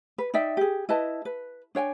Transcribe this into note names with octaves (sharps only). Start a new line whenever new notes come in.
B4
D#4 D5 E5 G5
G4 G#4
E4 B4 D#5 A5
B4
D4 C#5 G5 G#5